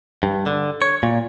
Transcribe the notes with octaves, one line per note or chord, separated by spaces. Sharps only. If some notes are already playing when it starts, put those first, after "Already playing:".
G2
D3
C#5
A#2